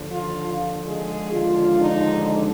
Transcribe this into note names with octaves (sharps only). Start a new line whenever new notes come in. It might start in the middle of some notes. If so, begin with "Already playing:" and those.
Already playing: D#2 D3 F3
F4
G#3 G#4
D#2 D3 F3 G#3 D4 F4
D#4